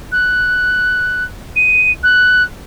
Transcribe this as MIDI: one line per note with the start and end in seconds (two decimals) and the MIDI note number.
0.12 1.24 90
1.55 1.90 99
2.03 2.43 90